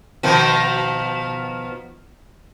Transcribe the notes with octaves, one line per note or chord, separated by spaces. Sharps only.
B2 D#3 F3